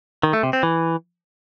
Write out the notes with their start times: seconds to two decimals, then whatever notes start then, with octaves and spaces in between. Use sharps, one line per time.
0.23 D#3
0.33 A3
0.43 C3
0.53 C4
0.63 E3